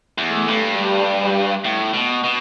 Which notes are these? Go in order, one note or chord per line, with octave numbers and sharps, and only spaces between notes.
E2
A3
G2
G3
A2
B2
B2